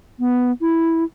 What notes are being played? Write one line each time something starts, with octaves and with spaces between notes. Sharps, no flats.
B3
E4